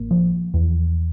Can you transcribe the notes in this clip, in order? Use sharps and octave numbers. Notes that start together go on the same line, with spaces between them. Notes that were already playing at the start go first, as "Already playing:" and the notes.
Already playing: A1 A#3
F3
E2